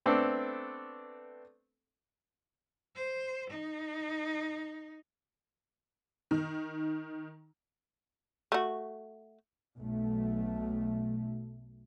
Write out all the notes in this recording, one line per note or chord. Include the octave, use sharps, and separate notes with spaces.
A3 B3 C4 D4 A4
C5
D#4
D#3
A3 F#4
B1 A3